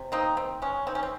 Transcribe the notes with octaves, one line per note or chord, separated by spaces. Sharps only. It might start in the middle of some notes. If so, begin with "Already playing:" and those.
Already playing: C3
A#3 C4 D#4
D#3 C4
G#3 C#4
D#3 C4
C#4
C4